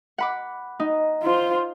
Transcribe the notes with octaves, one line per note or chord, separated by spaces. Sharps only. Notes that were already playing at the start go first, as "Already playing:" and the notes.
F#5 B5 D6
D#4
F4 C5